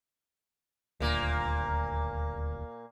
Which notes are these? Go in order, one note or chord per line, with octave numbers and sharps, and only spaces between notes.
D#1 D2 A#2 A#3